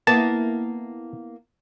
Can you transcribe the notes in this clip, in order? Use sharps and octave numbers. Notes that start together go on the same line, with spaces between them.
A#3 B3 E4 A5